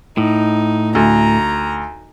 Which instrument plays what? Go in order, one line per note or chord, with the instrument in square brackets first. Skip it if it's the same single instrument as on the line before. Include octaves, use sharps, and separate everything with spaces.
[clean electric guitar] A2 [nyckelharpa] D#4
[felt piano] D2 [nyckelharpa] A#5